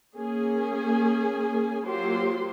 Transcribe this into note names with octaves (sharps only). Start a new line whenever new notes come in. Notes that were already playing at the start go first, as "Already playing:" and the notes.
A#3 C#4 G#4 G#5
F#3 A#3 F4 G4 C5 C6